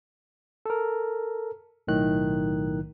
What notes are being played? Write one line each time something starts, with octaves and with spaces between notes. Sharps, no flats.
A4 A#4
B1 A2 D#3 F#6